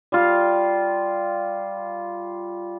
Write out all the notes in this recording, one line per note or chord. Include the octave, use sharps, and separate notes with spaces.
G3 F4